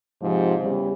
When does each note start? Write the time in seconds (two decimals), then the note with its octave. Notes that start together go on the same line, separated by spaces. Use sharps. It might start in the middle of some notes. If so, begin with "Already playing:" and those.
0.22 G#2 C3 F3
0.61 E2 C#3 G3